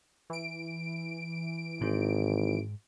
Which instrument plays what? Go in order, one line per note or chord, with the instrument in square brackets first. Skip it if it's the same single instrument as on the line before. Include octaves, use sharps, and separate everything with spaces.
[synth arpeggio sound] E3 D7
[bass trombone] G#1 [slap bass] G#2